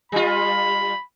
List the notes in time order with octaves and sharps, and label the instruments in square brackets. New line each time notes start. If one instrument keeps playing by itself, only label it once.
[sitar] G3 F4 [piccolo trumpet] B5